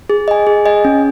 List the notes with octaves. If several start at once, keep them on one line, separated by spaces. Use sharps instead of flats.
G#4
D#5 G#5
G#4
D#5 G#5
C#4